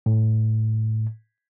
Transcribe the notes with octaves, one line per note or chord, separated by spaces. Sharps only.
A2